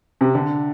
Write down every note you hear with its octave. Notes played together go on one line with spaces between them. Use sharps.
C3
D3